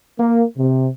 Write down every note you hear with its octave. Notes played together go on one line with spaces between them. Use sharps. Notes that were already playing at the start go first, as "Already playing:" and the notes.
A#3
C3